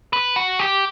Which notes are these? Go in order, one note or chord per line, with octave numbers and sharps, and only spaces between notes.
B4
F#4
G4